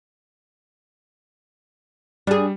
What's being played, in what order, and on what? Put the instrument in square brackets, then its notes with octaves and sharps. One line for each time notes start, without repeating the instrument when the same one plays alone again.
[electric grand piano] G3 [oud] D4 G#4